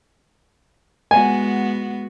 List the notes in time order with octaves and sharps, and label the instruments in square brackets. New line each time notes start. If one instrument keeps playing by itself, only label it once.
[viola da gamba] G#3 B3 F#4 [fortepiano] G#5